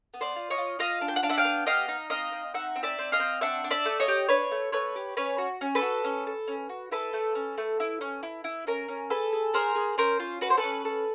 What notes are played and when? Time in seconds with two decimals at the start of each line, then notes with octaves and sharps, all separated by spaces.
0.14 B3
0.21 C5 D5
0.36 F4
0.50 C#5 D#5
0.58 F4
0.79 F4 D#5 F5
1.01 D4
1.08 G5
1.16 F#5
1.23 D4 F5
1.29 E5 F#5
1.38 F5 G5
1.45 B3
1.66 G4 D#5 F5
1.88 D#4
2.10 C4 D#5 F5
2.32 C4
2.54 D#4 E5 F#5
2.76 C4
2.83 D5 E5
2.98 C4
3.12 D#5 F5
3.19 C4
3.41 D4 E5 F#5
3.64 D4
3.71 D5 E5
3.85 A3
4.00 C#5 D#5
4.08 G4
4.29 D4 B4 C#5
4.51 A3
4.72 A3 B4 C#5
4.96 G4
5.17 C#4 B4 C#5
5.38 F#4
5.61 C#4
5.75 A4 B4
5.82 F#4
6.04 C#4
6.27 A4
6.48 C#4
6.69 F#4
6.91 E4 A4 B4
7.13 A3
7.35 C#4
7.58 A3
7.80 E4
8.01 C#4
8.23 E4
8.44 E4
8.67 C#4 A#4
8.88 C#4
9.10 G#4 A4 B4
9.33 G#4
9.53 G#4 A#4 C5
9.75 G#4
9.98 C#4 A#4 C5
10.20 F4
10.41 F#4 B4
10.50 C5
10.57 A4 B4
10.64 C#4
10.85 A4